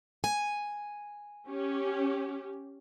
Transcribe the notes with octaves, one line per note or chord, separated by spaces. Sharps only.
G#5
C#4 G4